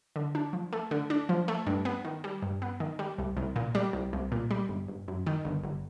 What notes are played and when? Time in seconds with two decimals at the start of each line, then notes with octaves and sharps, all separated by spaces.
0.16 D3
0.35 D4
0.53 F3
0.73 A3
0.91 D3
1.10 D4
1.29 F3
1.48 A3
1.66 G2
1.85 B3
2.05 D#3
2.24 G3
2.42 G2
2.62 B3
2.80 D#3
2.99 G3
3.18 C2
3.37 C2
3.56 A#2
3.75 G3
3.93 C2
4.13 C2
4.32 A#2
4.51 G3
4.69 G1
4.88 G1
5.08 F#2
5.27 D#3
5.45 G1
5.63 G1